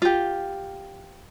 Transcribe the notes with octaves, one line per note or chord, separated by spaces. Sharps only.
F4 G4